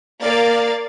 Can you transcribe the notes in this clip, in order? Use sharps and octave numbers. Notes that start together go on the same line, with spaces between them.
A#3 D5 F5 A6